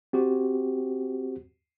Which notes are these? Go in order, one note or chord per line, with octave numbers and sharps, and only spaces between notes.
C4 F#4 G4